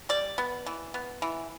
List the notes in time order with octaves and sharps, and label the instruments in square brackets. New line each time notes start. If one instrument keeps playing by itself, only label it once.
[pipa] G3 D5
B3
E3
B3
E3